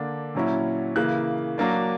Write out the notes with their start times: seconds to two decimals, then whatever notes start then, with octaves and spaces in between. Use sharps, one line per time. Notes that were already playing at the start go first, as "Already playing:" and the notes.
Already playing: D3 A#3 D4
0.35 A#2 F#3 C#4 E4
0.96 C#3 E3 A#3 F#6
1.58 F#3 A#3 D4